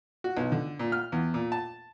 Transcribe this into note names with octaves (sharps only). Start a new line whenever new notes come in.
F#4
B1
D3
A#2
F6
E2
A#2
A5